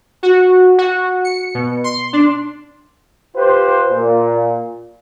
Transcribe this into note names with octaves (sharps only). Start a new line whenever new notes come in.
F#4
F#4
C#7
B2
C6
D4
F4 G4 B4 C5
A#2